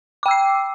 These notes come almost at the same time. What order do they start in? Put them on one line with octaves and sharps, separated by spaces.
D6 G5 E6 C7